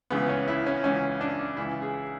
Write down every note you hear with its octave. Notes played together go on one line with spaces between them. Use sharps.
C#2 C#3 E3 B3
C#4
E4
C#4
C#2 C#3 E3 C#4
D4
C#2 C#3 E3 E4
G#4